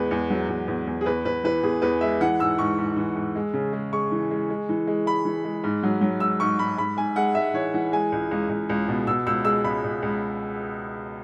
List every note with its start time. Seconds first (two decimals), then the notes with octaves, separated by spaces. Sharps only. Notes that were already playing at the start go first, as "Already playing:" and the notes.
Already playing: E2 G#3 B4
0.11 E2
0.30 F#3
0.48 E2
0.68 E2
0.87 E2
1.01 G#4
1.06 E2 B4
1.25 E2 B4
1.44 E3 B4
1.63 E2 G#4
1.82 E2 B4
2.01 G#3 E5
2.21 E3 F#5
2.39 G#2 E6
2.58 G#2 C#6
2.78 G#2
2.96 E3
3.16 G#2
3.36 G#3
3.54 C#3
3.73 G#3
3.93 G#3 C#6
4.11 E3
4.31 G#3
4.50 G#3
4.69 E3
4.87 G#3
5.06 G#3 B5
5.25 E3
5.44 G#3
5.64 G#2
5.83 F#3
6.01 F#3
6.20 G#2 E6
6.40 G#2 C#6
6.59 G#2 B5
6.78 G#2 B5
6.97 G#2 G#5
7.16 G#3 F#5
7.35 G#3 E5
7.54 E3 C#5
7.74 E3 F#5
7.92 G#3 G#5
8.12 C#2
8.31 C#2
8.49 C#2
8.69 C#2
8.88 B2
9.07 B2 E6
9.27 C#2 E6
9.44 G#3 E6
9.64 C#2 B5
9.84 C#2
10.02 C#2